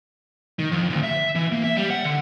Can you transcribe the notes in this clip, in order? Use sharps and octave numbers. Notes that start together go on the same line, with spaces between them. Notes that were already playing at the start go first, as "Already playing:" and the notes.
D#3
F2
D2
E5
E3
A#3
E5
G3
F#5
D3